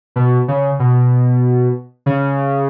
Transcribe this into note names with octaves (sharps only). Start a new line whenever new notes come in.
B2
C#3
B2
C#3